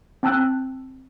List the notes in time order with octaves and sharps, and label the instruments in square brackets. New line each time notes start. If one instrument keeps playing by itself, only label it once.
[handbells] C4 G5 A5 E6 F#6